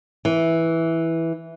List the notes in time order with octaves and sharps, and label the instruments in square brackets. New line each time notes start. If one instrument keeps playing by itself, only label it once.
[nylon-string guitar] E3